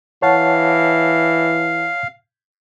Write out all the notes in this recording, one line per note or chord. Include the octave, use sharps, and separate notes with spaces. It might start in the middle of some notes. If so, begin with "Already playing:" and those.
E3 C#5 F5 F#5 A5